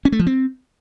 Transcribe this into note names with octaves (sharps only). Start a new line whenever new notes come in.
C#4
A3
F3
C4